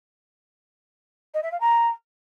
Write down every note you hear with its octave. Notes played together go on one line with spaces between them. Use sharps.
D#5
E5
F5
A#5